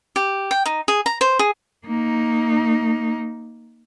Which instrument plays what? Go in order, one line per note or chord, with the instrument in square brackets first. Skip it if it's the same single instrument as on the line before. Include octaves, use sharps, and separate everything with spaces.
[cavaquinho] G4
G5
D#4
G#4
A#5
C5
G#4
[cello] A#3 D#4